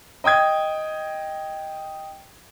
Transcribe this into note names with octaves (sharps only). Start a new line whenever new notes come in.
D#5 G5 D#6 G#6